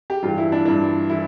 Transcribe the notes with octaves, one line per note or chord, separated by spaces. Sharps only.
G4
G2 E3 F4
E4
D4
G2 E3 D4
E3 E4